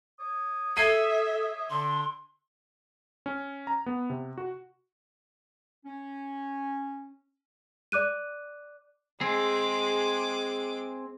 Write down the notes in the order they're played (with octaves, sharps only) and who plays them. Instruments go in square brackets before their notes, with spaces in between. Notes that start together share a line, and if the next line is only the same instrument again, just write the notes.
[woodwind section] C#5 D6 D#6
[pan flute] A4 [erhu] E5 [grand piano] G#6 C7 D#7
[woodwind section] D3 [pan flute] C6
[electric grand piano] C#4
A#5
B3
C3
F#4
[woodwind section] C#4
[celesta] D5 D6 F#6 D#7
[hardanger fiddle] G#3 D6 [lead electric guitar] C4 G#4